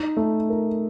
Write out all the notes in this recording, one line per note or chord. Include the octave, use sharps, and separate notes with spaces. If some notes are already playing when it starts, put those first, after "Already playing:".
Already playing: D#4
A3
A#4